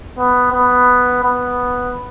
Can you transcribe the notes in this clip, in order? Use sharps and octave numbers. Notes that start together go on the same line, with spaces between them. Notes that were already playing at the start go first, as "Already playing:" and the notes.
B3
B3
B3